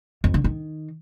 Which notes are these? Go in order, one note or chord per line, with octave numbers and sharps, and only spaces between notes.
F2
D3
D#3